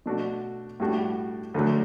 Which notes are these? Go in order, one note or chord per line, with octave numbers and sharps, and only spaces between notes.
B2 A3 D4 F#4
A2 G3 D4 F#4
D2 D3 F#3 A3